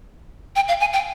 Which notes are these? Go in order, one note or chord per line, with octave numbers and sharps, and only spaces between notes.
G5
F5
G#5
G5